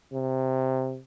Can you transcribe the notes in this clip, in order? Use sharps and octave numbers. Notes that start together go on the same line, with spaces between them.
C3